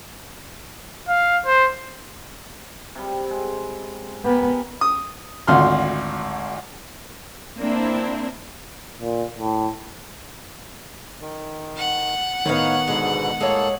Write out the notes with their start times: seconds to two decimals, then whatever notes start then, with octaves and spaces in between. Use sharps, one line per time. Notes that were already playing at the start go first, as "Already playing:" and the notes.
1.09 F5
1.46 C5
2.95 C3 G3
3.31 G#3
4.24 B3 G4 A#4 G#5
4.81 D#6
5.47 G#1 D2 F4 F#5 C6 F6
7.59 A#3 C4 D4 E4
9.02 A#2
9.39 A2
11.21 D#3
11.76 F#5
12.46 A2 D#3 B3 D#4 C#5 F5
12.88 G#2 B2 D3 G#3
13.40 A2 G#3 A#3 A4 C#5